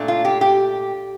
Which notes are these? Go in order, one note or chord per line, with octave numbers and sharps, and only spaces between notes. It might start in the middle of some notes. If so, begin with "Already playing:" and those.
Already playing: A#2 A3 D4
F4
G4
G4